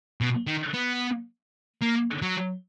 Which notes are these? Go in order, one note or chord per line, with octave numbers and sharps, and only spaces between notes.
B2
D#3
B3
A#3
F#3